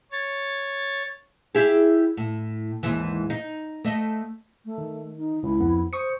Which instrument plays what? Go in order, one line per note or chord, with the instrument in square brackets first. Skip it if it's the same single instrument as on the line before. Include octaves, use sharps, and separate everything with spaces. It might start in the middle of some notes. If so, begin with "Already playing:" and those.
[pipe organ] C#5 A6
[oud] E4 G4 G#4
A2
D#2 G#2 E3
D#4
A3 D#5
[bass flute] A3
[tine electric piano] D#3
[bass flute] D#4
[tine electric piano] C#2 [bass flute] E4
[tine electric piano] F2 B3
[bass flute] C5 [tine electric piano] C#6 D#6 C#7